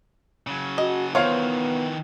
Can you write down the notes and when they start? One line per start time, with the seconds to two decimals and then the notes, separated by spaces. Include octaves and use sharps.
0.47 C#3 F#3
0.78 F#4 D#5
1.15 D#3 E3 B3 F4 C5 C#5 F5